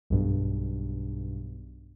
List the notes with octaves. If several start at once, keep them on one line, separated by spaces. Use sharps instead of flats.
B1 G2